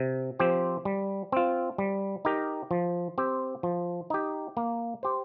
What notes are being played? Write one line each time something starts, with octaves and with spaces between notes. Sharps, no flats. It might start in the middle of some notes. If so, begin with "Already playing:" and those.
Already playing: C3
F3 C4 G4 C5
G3
C4 F4
G3
D#4 G4 A#4
F3
C4 G4
F3
D#4 G4
A#3
G4 C5